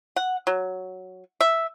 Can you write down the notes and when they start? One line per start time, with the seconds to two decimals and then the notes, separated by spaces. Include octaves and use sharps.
0.16 F#5
0.47 F#3
1.41 E5